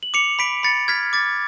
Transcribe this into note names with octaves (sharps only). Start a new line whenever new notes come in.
F#7
D6 C#7 F7
B5 B6 D7
B5 A6 C#7
F6 G#6 B6
D6 A6